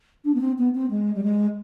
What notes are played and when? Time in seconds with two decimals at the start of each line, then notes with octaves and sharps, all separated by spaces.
0.24 D4
0.34 B3
0.40 C4
0.58 B3
0.74 C4
0.90 G#3
1.15 G3
1.23 G#3